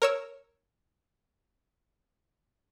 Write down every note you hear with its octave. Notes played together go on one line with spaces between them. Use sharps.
A#4 C#5 E6